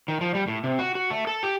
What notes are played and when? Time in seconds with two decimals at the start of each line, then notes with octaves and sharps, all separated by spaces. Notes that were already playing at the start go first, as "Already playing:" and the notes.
0.08 D#3
0.21 F3
0.35 G3
0.48 A2
0.64 C3
0.79 F#4
0.95 F#4
1.10 A3
1.27 A4
1.43 G4